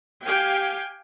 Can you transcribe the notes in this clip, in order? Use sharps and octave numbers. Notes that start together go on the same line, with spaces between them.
G4 F5 G5 G#5